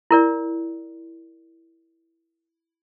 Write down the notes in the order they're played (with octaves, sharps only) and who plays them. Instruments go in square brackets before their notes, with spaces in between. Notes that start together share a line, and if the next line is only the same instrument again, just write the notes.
[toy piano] E4 A#4 D5